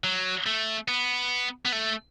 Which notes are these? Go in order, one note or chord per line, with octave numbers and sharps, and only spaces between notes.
F#3
A3
B3
B3
A3